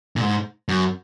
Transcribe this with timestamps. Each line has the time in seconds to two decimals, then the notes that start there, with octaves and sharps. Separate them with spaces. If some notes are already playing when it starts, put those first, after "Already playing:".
0.16 A#2
0.21 G#2
0.69 F#2